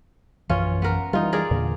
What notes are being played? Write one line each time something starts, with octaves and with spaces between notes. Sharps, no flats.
A#1 F#2 E3 C#4 F4
B3 A#4
E3 F#3 G3 D#4 F4
G#4 A#4 D5
E2 A#2 D3